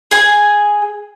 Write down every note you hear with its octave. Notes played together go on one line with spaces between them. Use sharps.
G#4 G#5